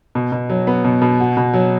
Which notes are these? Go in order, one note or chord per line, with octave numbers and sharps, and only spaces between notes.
B2
B2
F#3
B3
B2
B2
F#4
B2
F#3